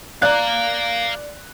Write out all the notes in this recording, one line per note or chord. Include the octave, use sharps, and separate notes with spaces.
D5 F5 A#5 F#6